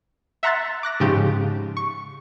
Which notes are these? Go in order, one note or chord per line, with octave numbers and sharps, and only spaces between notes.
E5 F#5 A#5 C6 F#6 A6
D6 F#6 A#6
G#2 C#3 F3 G4
C#6